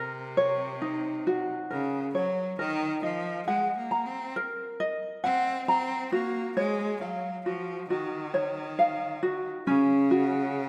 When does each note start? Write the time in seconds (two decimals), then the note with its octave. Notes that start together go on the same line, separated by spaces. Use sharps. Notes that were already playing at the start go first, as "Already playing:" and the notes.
Already playing: C3 A#4
0.37 C#5
0.82 D#4
1.27 F#4
1.70 C#3 A#4
2.15 F#3 C#5
2.59 D#3 A#4
3.03 F3 D#5
3.47 G#3 F#5
3.77 A#3
3.91 A#5
4.06 C4
4.36 A#4
4.80 D#5
5.24 C4 F#5
5.68 C4 A#5
6.12 A#3 F#4
6.57 G#3 C#5
7.01 F#3 F5
7.46 F3 F#4
7.90 D#3 F#4
8.34 C#5
8.79 F5
9.23 F#4
9.67 C#3 C#4
10.11 F#4